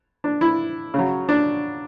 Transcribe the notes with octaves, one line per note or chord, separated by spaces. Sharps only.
D4
E4
C#3 F#3
D4